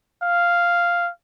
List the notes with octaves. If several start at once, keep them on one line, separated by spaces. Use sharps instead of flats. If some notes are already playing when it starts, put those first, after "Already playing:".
F5